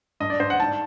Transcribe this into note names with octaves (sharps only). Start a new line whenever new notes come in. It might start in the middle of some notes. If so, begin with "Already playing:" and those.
G2 D#5
D5
G2 C5
F#5
G#2 A5